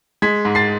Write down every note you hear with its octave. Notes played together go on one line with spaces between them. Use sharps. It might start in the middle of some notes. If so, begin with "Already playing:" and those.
G#3 G#6 B6
G#2
A6 C7